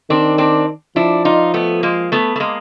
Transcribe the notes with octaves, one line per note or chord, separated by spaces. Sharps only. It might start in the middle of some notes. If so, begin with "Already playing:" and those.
D#3 C4 D4
C4 D4
F3 D4 E4
D#4 F4
A3 B3
G#3 A#3
A3 B3
A3
G#3 A#3